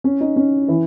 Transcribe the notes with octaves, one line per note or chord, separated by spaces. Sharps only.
C#4
D#4
C#4
E3